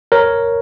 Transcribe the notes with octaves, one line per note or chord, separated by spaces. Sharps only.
A#4 C#5